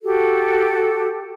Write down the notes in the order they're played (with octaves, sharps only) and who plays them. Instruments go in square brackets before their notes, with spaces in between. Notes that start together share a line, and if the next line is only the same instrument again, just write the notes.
[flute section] F#4 G4 A4